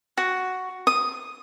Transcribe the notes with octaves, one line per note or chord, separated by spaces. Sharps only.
F#4
D#6